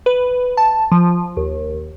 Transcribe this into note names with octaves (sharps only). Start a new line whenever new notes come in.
B4
A5
F3
D#2